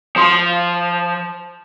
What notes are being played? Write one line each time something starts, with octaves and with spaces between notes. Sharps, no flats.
F3 C6